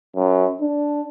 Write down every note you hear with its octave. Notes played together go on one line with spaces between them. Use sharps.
F#2
D4